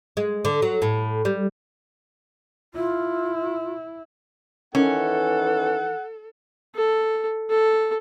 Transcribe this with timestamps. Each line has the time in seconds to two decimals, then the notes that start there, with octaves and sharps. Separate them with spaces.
0.17 G#3
0.45 D3
0.62 F#3
0.82 A2
1.25 G3
2.74 E4 F4
4.75 D#3 E3 C#4 A4 F#5
6.75 A4
7.50 A4